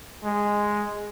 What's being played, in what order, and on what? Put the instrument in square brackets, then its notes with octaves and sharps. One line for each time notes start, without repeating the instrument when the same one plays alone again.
[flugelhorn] G#3